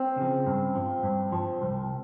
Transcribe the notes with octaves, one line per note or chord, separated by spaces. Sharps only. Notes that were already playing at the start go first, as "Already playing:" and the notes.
Already playing: C4
C#3 F3
G2
F3
G2
F3
C2